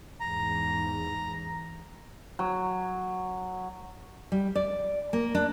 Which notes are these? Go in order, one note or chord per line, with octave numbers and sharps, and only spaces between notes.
E2 G#2 A#5
F#3
G3
D5
A#3
D4